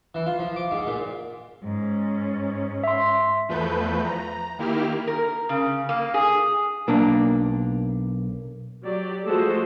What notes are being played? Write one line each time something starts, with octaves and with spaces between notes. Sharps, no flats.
E3
F4
F3
D6
G#2
A#2
G#2 C#4
E5 C6
E2 F3 A3 B4 G6
A#5
D#3 A#3 E4 G4 F6
A#4
C#3
A#3
G#4
B1 A#3 D4
F#3 G4 D5
F3 G#3 A3 F#4 A4 C5